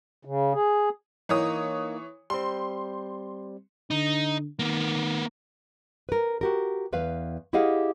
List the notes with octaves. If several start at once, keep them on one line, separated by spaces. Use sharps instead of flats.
C#3
G#4
E3 A#3 D#4 C#5 D#6
G3 C4 C6
D3 D#4
D#3 A#3 B3
A#4 B4
F#4 G4 A#4
E2 B4 F5
E4 G4 G#4 D#5 F5 F#5